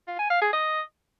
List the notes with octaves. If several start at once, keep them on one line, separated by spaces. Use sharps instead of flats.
F4
G#5
F5
G#4
D#5